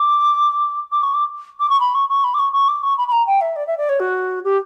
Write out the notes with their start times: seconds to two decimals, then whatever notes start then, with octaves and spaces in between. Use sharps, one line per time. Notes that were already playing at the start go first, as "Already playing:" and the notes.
Already playing: D6
0.92 D6
1.03 C#6
1.14 D6
1.60 D6
1.70 C#6
1.80 B5
1.94 C#6
2.09 C#6
2.24 B5
2.34 D6
2.39 C#6
2.53 C#6
2.68 D6
2.83 C#6
2.98 B5
3.08 B5
3.12 A#5
3.26 G5
3.41 E5
3.56 D5
3.67 E5
3.78 D5
3.89 C#5
4.00 F#4
4.44 G4